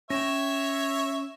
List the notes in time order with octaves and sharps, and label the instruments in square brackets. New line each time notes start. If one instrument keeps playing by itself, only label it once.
[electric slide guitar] C#4 G5 [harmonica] C#5 E5 [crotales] A#6 E7